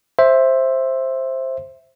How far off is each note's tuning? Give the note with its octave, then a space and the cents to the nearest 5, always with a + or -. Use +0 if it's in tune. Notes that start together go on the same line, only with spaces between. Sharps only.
C5 +10 E5 +0